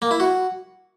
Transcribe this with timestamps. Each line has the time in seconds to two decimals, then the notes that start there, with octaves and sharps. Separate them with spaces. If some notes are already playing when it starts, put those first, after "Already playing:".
0.02 A#3
0.11 E4
0.20 F#4